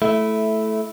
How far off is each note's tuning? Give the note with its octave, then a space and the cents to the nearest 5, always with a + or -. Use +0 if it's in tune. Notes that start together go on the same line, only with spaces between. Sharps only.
A3 -10 E4 +0